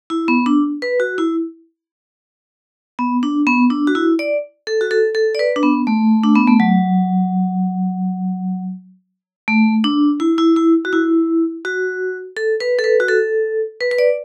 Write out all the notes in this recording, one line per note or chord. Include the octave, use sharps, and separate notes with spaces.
E4
B3
D4
B4
F#4
E4
B3
D4
B3
D4
F#4
E4
D5
A4
F#4
A4
A4
D5
B4
D4
B3
A3
D4
B3
A3
F#3
A3
D4
E4
E4
E4
F#4
E4
F#4
A4
B4
A4
B4
F#4
A4
B4
B4
D5